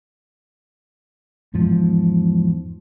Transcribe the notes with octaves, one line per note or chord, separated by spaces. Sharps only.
E2 G#2 F3